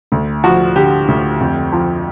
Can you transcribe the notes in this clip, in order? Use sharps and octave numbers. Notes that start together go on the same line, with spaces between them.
D2
F3 F#4
D3 G4
D2
F2
F3